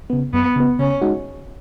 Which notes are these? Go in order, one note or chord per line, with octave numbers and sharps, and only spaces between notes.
C#3 B3
F#2 B3
C#3 B3
C#3 C#4
G#3 D#4 F#4